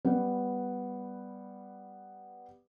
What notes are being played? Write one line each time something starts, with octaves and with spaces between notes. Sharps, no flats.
G3 B3 B4